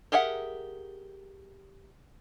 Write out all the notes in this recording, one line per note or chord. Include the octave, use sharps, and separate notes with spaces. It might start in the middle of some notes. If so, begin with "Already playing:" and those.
G4 G#4 A#4 E5 F#5